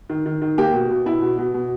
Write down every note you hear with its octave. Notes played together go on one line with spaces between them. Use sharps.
D#3
D#3
D#3
A#3 G4
B2
B2
B2 E4
B2
B2
B2